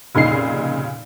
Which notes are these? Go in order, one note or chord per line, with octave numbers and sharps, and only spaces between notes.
F1 A#2 C#3 D#4 C7